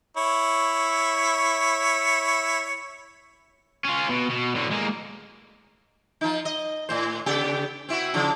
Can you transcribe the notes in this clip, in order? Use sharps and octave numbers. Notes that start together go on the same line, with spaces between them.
E4 C#5
C#4 F4
B2
B2
A2 D3
G#3 A#3
F3 D#4
D#5
A2 C5
C#3 B3 G4
C4 E4 F#4
C#3 F3